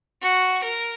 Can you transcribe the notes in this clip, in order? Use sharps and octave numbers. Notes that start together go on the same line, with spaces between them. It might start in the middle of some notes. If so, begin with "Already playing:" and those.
F#4
A#4